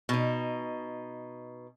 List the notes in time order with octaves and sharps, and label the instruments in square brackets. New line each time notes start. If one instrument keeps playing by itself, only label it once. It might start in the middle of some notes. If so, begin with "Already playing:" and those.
[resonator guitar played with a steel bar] B2 D#4